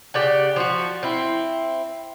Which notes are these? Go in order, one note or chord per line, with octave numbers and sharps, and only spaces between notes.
C#3 G4 D5 F#5
F3 F#4
C4 E4